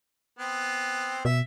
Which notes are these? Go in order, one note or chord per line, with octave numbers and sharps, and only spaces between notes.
B3 C4
B2 E5